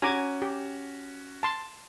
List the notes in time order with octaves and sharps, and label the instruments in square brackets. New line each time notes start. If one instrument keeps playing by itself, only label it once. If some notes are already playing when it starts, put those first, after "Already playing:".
[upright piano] C#4 F#4 [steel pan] G#5 A#5 D6
[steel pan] G4
A5 C6